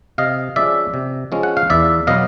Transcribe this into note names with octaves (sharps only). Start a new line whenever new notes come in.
C3 D#5 F5
F3 G#3 C#4 D5 E5
C3
F3 G#3 C#4
F#5
F5
E2 D5 E5
B2 F#3 B3 D#5 F5